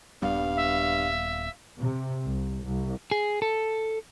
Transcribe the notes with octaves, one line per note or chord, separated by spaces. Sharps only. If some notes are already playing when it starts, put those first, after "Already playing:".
D#1 G2 G3 B3 F5
E5
C3
C2
C2
G#4
A4